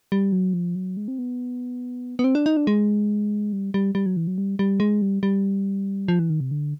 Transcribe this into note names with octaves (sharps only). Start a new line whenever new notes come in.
G3
F#3
F3
F#3
G#3
C4
B3
B3
C4
D4
D#4
D4
G#3
G3
G3
G3
F#3
E3
F#3
G3
G3
G#3
G3
G3
F3
E3
D#3
C3
D3